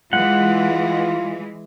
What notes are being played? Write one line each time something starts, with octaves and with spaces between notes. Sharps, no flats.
E3 G#3 F4 F#5